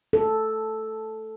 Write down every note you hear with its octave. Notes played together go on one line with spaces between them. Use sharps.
A4